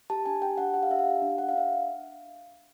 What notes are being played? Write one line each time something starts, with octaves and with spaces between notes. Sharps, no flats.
G4 A5
D4 G#5
G4 G5
D4 F#5
G4 F#5
F5
D4 E5
F5
G4
D4
G4 F#5
F5
D4 E5